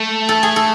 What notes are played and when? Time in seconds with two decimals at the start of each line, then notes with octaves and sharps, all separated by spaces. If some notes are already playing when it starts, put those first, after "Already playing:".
Already playing: A3
0.29 A4
0.43 G#4
0.56 A4